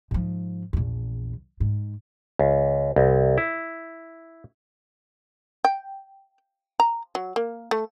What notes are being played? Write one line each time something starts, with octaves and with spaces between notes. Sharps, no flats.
G#2 F3
A#1 E2
G#2
C#2
C2
E4
G5
A#5
F#3
A#3
A3